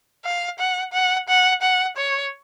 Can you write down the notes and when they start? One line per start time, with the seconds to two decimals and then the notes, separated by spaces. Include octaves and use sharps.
0.25 F5
0.59 F#5
0.93 F#5
1.29 F#5
1.62 F#5
1.97 C#5